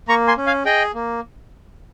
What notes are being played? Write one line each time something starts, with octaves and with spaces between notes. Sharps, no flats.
A#3 A#5 C#6
G#5 C6
C#4
F5 G#5
G#4 D#5 G5
A#3